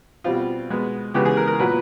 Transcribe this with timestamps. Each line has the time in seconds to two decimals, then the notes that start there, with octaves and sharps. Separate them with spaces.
0.24 B2 G3 C4 F4
0.70 B2 G#3 B3
1.14 C#3 E3 G#3 B3 G4
1.25 G#4
1.37 A#4
1.47 A#4
1.59 A#2 F#3 B3 B4